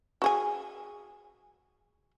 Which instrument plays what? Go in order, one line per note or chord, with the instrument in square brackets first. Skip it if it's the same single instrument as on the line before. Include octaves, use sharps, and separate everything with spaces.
[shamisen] F#4 G#4 G#5